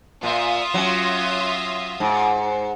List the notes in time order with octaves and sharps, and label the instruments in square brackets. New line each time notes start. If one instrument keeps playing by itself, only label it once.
[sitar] A#2 [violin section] F4 E5 D#6
[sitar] F#3 C#4
G#2